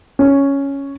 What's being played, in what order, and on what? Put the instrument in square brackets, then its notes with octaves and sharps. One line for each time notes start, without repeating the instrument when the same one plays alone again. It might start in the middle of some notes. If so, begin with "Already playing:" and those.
[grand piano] C#4